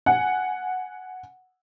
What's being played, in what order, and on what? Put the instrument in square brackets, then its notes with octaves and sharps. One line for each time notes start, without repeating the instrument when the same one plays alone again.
[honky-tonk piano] F#5 G#5